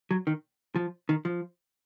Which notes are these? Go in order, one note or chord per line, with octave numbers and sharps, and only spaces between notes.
F#3
D#3
F3
D#3
F3